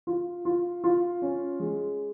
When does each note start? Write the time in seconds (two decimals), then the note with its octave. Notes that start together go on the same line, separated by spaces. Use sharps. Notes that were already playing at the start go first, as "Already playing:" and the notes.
0.07 F4
0.45 F4
0.84 F4
1.22 C#4
1.60 G#3